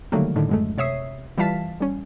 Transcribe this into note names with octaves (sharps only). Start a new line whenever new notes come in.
D3 D#3 F#3 G3 A3 A#3
A2 D3 D#3
F#2 G#3 A3
C3 C#5 E5 D#6 C7
E3 G3 F4 F5 A5 B6
G3 C#4